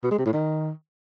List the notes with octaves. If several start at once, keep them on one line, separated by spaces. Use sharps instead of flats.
B2
G#3
C3
A2
D#3